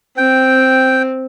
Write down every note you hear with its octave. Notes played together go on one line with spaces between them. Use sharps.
C4 G5